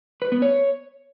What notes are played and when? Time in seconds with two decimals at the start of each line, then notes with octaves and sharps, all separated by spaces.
0.22 B4
0.32 B3
0.42 C#5